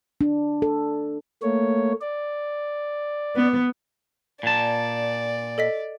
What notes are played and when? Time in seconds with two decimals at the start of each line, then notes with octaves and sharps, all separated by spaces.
0.21 D4
0.62 A4
1.42 A3 A#3 C#5
2.01 D5
3.36 B3
4.43 A#2 D5 A5
5.58 A4 D#5 B6